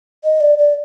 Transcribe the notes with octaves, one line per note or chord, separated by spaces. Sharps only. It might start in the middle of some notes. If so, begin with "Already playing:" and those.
D#5
D5
D5